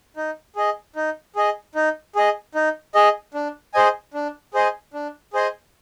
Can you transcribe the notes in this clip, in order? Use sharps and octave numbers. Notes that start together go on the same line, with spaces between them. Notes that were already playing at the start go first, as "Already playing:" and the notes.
D#4
G#4 D#5
D#4
G#4 D#5
D#4
G#4 D#5
D#4
G#4 D#5
D4
G#4 C5 D#5 G#5
D4
G#4 C5 D#5 G#5
D4
G#4 C5 D#5 G#5